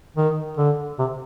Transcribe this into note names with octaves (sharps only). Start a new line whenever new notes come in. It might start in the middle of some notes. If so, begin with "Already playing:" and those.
D#3
D3
C3